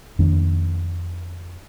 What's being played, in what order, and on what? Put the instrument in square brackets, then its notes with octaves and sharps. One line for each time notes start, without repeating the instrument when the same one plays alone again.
[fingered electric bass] F2 D#3 A#3 D4